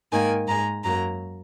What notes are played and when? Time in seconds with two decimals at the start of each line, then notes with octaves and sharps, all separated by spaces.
0.12 G#2 D#3 A#3 G#5
0.47 G#2 G#3 A#5
0.84 F#2 F#3 A#3 A#5